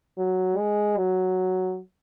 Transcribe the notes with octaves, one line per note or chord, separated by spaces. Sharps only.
F#3
G#3
F#3